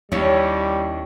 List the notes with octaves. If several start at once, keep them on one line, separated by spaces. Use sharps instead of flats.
D#2 G3 C#4 D4 E4